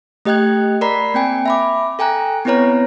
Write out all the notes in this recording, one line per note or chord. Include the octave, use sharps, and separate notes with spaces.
A3 G4 D#5 G5 F#6 G#6
A#4 D5 A#5 B5 B6 C7
A#3 C4 G5 G#5
E5 B5 D6
A4 G5 G#5 A#5 F#6
B3 C4 E4 B4 C#5 A#5